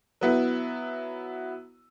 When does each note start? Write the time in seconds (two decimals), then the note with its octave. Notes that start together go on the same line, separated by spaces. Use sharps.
0.21 F#3 B3 E4